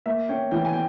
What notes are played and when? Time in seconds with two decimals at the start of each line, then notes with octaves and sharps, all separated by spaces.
0.06 A#3 E5
0.29 C#4 G5
0.51 E3 G5
0.65 G#5
0.73 G5